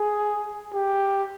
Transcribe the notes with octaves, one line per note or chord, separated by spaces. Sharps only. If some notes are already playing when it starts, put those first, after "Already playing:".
Already playing: G#4
G4